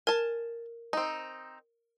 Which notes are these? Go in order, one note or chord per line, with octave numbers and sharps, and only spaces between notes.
A#4 G#5 A5
C4 D#4